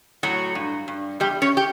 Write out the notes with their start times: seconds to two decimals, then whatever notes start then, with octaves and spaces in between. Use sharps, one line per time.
0.23 A2 F#3 F#4
0.55 G2
0.88 G2
1.20 E2 G3 G4
1.42 C#4 C#5
1.57 G4